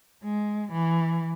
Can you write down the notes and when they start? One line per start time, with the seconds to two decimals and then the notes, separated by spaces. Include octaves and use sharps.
0.24 G#3
0.73 E3